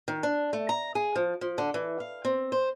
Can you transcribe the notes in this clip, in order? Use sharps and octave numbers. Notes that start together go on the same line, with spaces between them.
D#3
D4
A3
A#5
G#4
F3
F3
D3
E3
F5
C4
C5